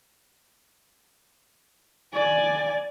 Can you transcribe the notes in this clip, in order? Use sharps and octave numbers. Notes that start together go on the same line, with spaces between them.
D5 G#5